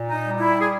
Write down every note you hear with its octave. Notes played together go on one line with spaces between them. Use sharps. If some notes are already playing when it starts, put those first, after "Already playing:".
Already playing: A#2
D#4
G3
E4
G#4